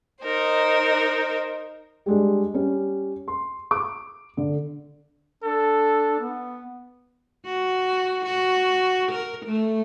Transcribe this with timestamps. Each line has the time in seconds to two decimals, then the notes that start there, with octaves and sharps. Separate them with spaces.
0.23 D#4 A#4 C5
2.06 G3 G#3 D4
2.54 G3 C#4
3.28 C6
3.71 D6
4.37 D3
5.43 D4 A4
6.20 B3
7.46 F#4
8.24 F#4
9.11 A#4
9.45 A3